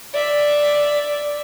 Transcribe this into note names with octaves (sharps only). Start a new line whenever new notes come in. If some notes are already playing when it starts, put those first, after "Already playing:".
D5 E5